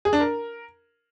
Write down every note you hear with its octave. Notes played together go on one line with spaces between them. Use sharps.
G#4
D4
A#4